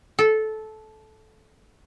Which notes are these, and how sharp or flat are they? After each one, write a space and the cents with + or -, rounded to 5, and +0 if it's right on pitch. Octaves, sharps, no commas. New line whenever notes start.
A4 -15